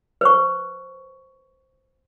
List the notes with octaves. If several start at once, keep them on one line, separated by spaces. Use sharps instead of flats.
B4 C5 C#6